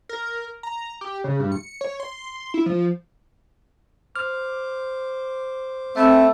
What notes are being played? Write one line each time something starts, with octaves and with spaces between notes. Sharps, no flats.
A#4
A#5
G4
C#3
G2
C#7
C#5
C6
E4
F3
C5 D6 F6
A3 C4 E5 B5 E6